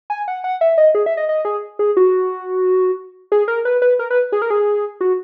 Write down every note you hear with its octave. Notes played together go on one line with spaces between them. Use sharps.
G#5
F#5
F#5
E5
D#5
G#4
E5
D#5
D#5
G#4
G#4
F#4
G#4
A#4
B4
B4
A#4
B4
G#4
A#4
G#4
F#4